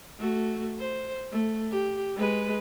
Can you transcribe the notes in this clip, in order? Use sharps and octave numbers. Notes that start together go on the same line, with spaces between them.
A3 F#4
C5
A3
G4
G#3 B4